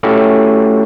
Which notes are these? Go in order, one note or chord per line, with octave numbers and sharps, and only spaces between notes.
A3 C#4 E4 F#4 G4 A4